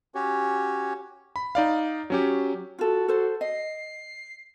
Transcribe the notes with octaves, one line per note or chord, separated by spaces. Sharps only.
C#4 F#4 G4 C#5
B5
D#4 D5 F5
F#3 C#4 G4
F4 F#4 A4
A4 C5
D#5 C7